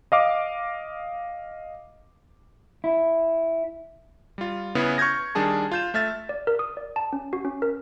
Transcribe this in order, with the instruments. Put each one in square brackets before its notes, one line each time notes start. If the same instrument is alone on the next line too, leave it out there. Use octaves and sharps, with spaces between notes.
[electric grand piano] D#5 F5 D6
[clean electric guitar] E4
[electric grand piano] G3 F4
C#3 B3 E4 G#4 B4
C#6 F6 G6 G#6 A#6
D#3 G3 D4 G#4 A5
F4 G6 E7
A3 E5 F6 A6
[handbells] D5
A#4
D#6
D5
A5
C#4
F#4
C#4
A#4